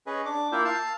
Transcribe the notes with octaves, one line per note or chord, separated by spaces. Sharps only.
C#4 G#4 B4 D#5
D4 D6
A#3 E4 F4 E5 G5
F5 A5 E6